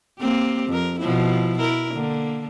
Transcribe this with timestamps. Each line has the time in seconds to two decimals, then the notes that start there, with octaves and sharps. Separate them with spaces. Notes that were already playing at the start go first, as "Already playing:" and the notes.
0.19 A#3 C4 G4
0.68 F2 A#4
0.99 B2 F3 E4
1.58 E4 A#4
1.93 D3 A#3